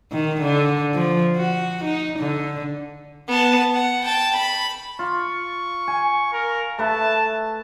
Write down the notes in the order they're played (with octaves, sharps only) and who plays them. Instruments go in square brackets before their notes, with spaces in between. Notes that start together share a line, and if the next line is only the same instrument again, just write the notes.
[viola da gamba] D#3
D3
F3
F#4
D#4
D3
[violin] B3 A5
F#5
G5 A5
B5
[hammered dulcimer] F4 [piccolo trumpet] C#6
[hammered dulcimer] G#5
[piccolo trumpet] A#4
[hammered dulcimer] A3 B4 E5 [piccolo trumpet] A5